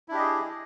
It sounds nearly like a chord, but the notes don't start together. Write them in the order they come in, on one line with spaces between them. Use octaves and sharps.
E4 D4 G4 D#5 G#4